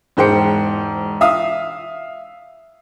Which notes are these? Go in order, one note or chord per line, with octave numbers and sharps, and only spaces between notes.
E1 G#2 C5 G5 C#7
E5 F5 D#6